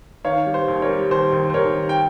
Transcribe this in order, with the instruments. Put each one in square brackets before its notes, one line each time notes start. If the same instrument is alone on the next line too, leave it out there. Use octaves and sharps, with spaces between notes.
[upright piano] D#3 C#5 F5
G3
C5
D#2
A#4 C#5
G3
D#2 C5
D#2
C5
D#2 A#4 C#5
D#3
G5